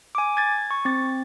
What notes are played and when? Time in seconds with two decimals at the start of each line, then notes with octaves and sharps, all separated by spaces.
0.15 G#5 D6
0.37 G#6 A6
0.71 C#6
0.85 C4 A6